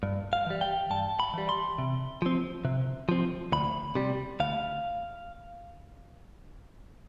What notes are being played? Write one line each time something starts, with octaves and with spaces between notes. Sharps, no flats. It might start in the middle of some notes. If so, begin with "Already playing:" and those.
G2
F5
E3 G3
G5
G2 A5
B5
E3 G3
C6
C3
F3 C4
C3
F3 C4
D2 B5
C3 G3
D2 F5